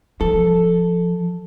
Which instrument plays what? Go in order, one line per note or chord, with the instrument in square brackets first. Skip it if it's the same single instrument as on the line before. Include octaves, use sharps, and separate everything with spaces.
[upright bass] F3 [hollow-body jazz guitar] A4